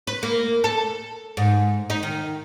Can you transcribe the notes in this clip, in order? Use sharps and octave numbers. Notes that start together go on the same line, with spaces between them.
B4
A#3
A4
G#2
D#4
D#3